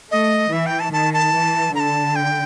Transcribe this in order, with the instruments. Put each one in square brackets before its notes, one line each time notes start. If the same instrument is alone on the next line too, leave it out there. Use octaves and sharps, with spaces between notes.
[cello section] A3 [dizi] D#5
[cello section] E3 [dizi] E5
[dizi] G5
A5
[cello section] D#3 [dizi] A5
[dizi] A5
[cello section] E3
[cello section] D3 [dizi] A#5
[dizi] A5
G5